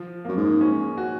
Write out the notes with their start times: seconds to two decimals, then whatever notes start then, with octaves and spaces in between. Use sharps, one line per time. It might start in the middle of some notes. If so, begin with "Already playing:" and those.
Already playing: F3
0.25 F#2 A#3
0.37 G#2
0.61 C#4
0.97 F#4